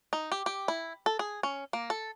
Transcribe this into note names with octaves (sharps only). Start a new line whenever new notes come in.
D#4
G4
G4
E4
A4
G#4
C#4
A#3
A4